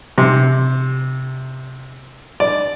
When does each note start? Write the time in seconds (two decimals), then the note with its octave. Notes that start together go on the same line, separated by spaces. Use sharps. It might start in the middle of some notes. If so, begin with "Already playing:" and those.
0.18 C3
2.40 D5